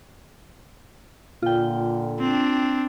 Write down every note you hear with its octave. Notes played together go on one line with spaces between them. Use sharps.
A#2 D3 F4 G5
C4 D4